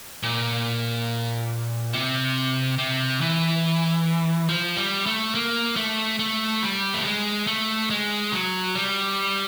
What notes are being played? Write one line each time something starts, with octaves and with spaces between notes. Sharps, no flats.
A#2
C3
C3
E3
F3
G3
A3
A#3
A3
A3
G3
A3
G#3
A3
G#3
F#3
G3